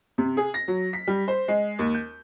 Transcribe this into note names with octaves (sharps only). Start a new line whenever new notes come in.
C3
G#4
A#6
F#3
B6
G3
C5
G#3
D#2
G6